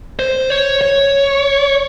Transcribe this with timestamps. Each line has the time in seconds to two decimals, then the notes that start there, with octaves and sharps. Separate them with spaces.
0.19 C5
0.50 C#5
0.81 C#5